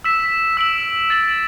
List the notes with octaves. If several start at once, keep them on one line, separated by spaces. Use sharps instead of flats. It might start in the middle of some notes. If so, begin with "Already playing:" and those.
E6 B6 E7
E6 D7 F#7
A6 D7 F#7